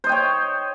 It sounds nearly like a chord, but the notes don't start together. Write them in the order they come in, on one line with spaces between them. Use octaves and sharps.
C5 D#5 G5 C#5